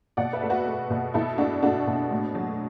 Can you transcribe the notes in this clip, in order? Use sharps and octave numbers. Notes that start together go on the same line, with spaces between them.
B2 D5 F#5
B4 E5
A3
F#4 B4
A3
B2
B2 E4 A4
A3 D4 F#4
A3 D4 F#4
B2
A2
F#3